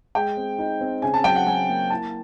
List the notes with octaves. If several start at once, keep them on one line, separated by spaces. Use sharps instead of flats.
G#3 G5
C4
D#4
C4
C#3 G#5
A5
F#3 G5
F#5
F#3 G#5
A#3
E4 A5